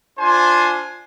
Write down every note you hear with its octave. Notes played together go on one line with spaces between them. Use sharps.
D4 F4 C5 G#5 C6